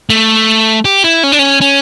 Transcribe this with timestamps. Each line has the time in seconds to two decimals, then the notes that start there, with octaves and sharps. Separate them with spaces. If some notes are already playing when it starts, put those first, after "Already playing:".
0.10 A3
0.85 G4
1.04 E4
1.23 C#4
1.32 D4
1.39 C#4
1.61 C#4